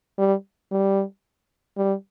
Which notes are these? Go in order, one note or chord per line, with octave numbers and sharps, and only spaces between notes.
G3
G3
G3